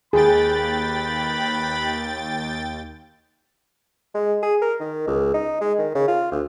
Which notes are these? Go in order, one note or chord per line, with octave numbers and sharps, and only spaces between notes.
D#2 G#4 B4 G5 B5 A6
G#3
G#4
A#4
D#3
C#2
D#4
G#3
D#3
C#3
F4
D2